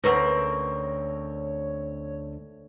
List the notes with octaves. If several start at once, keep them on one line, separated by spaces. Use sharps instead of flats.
D2 C4 C#4 A#4 B4 C#5 F#5